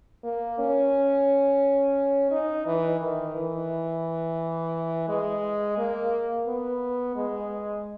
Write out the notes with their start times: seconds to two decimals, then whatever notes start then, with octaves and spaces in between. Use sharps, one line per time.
0.24 A#3
0.59 C#4
2.31 D#4
2.66 E3
3.01 D#3
3.35 E3
5.09 G#3
5.78 A#3
6.47 B3
7.15 G#3